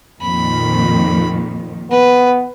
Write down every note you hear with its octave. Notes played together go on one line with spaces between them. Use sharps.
F2 A#2 D#3 B5
B3 B4